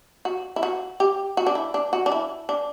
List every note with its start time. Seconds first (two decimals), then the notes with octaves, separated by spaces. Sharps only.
0.25 F#4
0.56 E4
0.63 F#4
1.00 G4
1.37 F#4
1.46 D4
1.55 E4
1.74 D4
1.93 F#4
2.06 D4
2.12 E4
2.49 D4